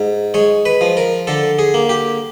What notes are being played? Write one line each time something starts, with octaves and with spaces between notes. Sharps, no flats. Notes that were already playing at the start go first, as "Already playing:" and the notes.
Already playing: G#2
G#3 C#5
B4
F3
A#4
D3 A4
G#4
A#3
G4